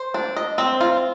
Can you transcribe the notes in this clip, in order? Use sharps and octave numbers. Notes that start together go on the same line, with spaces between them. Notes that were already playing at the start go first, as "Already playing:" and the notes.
Already playing: C5
D4
D#5
C4
F4